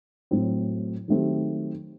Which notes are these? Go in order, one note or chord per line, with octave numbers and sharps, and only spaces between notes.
A2 F#3 C4
D#3 F#3 A3 C4 G4